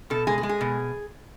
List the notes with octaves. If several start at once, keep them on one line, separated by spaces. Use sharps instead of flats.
B2 A4
G#3 G#4
G#4
G#3
G#4
B2